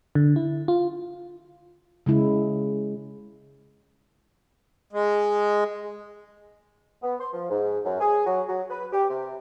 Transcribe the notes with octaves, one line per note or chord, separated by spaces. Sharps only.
D3
E4
F4
C#3 G#3 E4
G#3
B3
C6
F3
G#2
F#2
G#4
F#3
F#3
B4
G4
C3